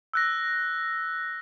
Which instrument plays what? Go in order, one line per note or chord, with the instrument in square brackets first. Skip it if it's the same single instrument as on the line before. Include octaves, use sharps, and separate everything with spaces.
[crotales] E6 F#6 A#6